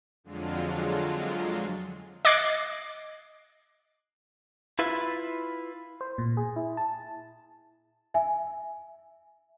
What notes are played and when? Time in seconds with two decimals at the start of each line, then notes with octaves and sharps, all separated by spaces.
0.24 F2 D3 F#3 G#3 F4
2.25 D#5 D6 F#6 G#6 C7
4.79 E4 F4 B4 E5
6.01 C5
6.18 A#2
6.37 G#4
6.56 E4
6.77 A5
8.14 E5 G#5